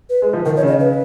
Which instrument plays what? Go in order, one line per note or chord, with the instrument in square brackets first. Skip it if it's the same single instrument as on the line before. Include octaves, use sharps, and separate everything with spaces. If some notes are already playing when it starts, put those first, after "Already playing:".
[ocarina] B4
[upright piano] G#3
F3
[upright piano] D#3 [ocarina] A#4
[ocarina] C#5
[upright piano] C#3 [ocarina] D#5
[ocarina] B4